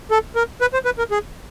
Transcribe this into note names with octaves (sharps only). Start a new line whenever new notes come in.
A4
A#4
B4
C5
B4
A#4
G#4